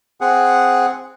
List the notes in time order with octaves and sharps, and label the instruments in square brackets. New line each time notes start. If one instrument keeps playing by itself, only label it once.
[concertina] C4 G#4 F#5